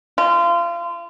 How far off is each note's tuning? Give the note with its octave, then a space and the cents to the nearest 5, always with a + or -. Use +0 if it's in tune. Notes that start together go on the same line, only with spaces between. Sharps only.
F4 -30